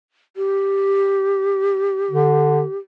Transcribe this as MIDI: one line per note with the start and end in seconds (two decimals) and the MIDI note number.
0.37 2.78 67
2.11 2.63 50